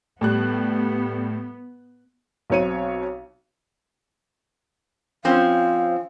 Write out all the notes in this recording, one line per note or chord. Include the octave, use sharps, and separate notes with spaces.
A2 G3 B3 F#6
B1 B2 C4 C#5 C#7 D#7
F3 C4 C#4 F5